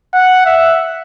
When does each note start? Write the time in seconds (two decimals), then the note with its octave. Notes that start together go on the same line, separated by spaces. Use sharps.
0.13 F#5
0.46 E5